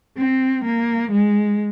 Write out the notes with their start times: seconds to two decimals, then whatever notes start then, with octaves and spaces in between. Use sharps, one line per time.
0.17 C4
0.65 A#3
1.11 G#3